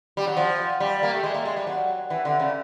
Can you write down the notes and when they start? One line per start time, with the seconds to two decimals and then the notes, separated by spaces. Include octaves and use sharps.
0.17 G3
0.27 F#3
0.37 F3
0.80 G3
1.03 A#3
1.13 A3
1.24 G#3
1.34 A#3
1.46 G#3
1.57 G3
1.67 F#3
2.10 E3
2.25 D3
2.40 C#3